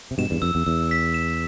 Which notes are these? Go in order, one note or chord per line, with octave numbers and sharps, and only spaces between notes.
C3
G2 B2 E7
E2 G2
F2 E6
E2
E2 E6
B6
E7